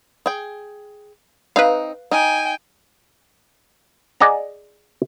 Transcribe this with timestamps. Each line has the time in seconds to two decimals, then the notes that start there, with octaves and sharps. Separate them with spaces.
0.26 G#4 G5
1.56 C4 D#4 B4 F5
2.11 D#4 G5 G#5
4.20 G#4 D5 D#5 F#5 A#5